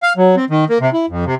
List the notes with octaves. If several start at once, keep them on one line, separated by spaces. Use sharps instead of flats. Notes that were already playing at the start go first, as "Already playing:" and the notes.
F5
F#3
C4
D#3
A#3
C3
E4
F2
C3